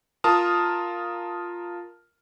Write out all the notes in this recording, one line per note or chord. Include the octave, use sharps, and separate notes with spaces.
F4 A#4 A5 D#6 F6